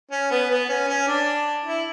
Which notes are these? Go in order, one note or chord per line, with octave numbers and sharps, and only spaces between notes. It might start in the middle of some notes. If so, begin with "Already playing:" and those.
C#4
B3
B3
C#4
C#4
D4
E4